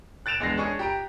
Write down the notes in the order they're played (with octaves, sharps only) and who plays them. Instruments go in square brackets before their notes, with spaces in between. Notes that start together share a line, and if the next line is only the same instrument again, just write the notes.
[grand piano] F#6 A6 D7 E7 F7
E2 G#3 D4 A#6 C7
C#4 D4 G#4 D#5 C#6
G4 A#5 D7